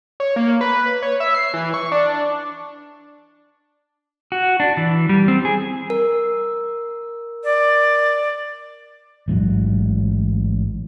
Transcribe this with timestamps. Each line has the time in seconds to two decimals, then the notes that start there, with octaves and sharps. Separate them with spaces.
0.20 C#5
0.36 A#3
0.61 B4
1.02 C#5
1.20 E5
1.35 C7
1.54 E3
1.74 C#6
1.92 D4
4.32 F#4
4.60 D4
4.77 E3
5.09 G3
5.28 C4
5.45 G#4
5.90 A#4
7.44 D5
9.28 A1 G#2 B2 F#3